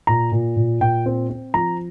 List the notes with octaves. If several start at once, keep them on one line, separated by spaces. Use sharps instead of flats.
A#2 A#5
A#2
A#2
A#2 G5
C4
C4
F3 A#5